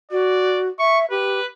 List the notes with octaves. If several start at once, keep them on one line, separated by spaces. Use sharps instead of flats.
F#4 D5
E5 C#6
G4 B4